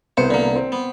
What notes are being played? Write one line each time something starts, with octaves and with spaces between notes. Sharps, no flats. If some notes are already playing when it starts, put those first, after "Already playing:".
C2 B3 C5 C#7
D3 A#3
C4
B3